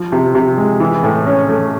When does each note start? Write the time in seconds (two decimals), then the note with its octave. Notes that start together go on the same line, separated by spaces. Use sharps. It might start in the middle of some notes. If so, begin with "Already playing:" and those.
Already playing: F3
0.12 C3
0.35 C3
0.58 G#3
0.80 E3
1.04 A2
1.27 C#4
1.49 A3